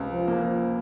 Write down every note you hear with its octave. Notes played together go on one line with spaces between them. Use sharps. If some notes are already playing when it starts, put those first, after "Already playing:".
Already playing: C#2 C3
F3
A#3
F3